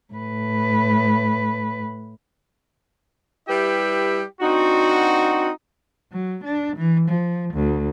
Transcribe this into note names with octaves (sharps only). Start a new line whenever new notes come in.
A2 B4
G3 E4 G4 B4 E5
C4 D4 D#4 F#4
F#3
D4
E3
F3
D2